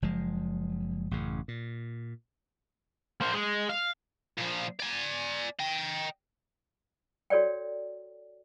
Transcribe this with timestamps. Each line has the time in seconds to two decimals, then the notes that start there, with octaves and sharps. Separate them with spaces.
0.02 F#1 F3 G#3
1.11 A1 F#2 C#3
1.48 A#2
3.21 A#3 C5
3.33 G#3
3.69 F5
4.38 A#2 F3
4.79 D5 G#5
5.59 D#5 G5
7.30 F#4 A4 C#5 D5 G5